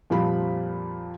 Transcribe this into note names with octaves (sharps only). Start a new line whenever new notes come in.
F2 A#2 F3 G3 B5